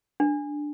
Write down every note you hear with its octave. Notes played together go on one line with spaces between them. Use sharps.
D4